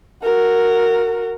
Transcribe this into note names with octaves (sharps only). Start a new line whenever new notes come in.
F#4 A#4